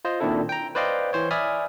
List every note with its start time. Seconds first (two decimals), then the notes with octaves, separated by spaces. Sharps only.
0.05 F4 C5 D#5
0.20 A#2 D#3 C4 D4 E4 A4
0.49 G5 A#5
0.75 B4 C5 D5 D#5 F5 G5
1.13 E3 C5 C#5
1.31 D5 E5 G#5 B5 D#6 F6